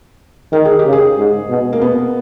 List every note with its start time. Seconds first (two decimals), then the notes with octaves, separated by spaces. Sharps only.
0.52 D#3 A#4
0.65 G#4
0.79 G4
0.85 C#3
0.93 G#4
1.18 G#2
1.49 B2
1.73 A#3
1.82 B2 B3